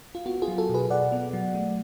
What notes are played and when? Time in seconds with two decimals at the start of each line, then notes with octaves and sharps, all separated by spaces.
0.15 F4
0.26 B3 F#4
0.42 F4 G#4
0.48 F#3
0.58 F#4 A4
0.69 B2
0.74 G#4 B4
0.90 B2 D5 F#5
1.12 B3
1.33 F#3
1.54 A3